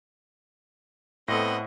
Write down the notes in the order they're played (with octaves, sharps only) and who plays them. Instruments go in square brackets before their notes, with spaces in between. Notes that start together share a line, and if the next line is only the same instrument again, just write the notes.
[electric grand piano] A2 [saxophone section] B3 C4 [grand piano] A4 C5 A#6 [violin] D#5 F#5